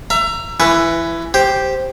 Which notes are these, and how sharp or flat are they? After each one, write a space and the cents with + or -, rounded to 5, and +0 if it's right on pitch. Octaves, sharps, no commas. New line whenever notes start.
E5 +30 A#5 +0
E3 +15 B4 +0 C#6 +0
G4 +0 C5 +0